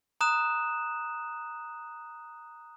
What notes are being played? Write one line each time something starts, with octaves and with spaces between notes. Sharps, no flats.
A#5 D#6 F#6 E7